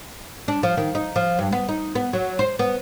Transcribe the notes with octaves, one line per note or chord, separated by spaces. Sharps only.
D4
F3
D#3
D#4
F3
G2
B3
D#4
B3
F#3
C5
B3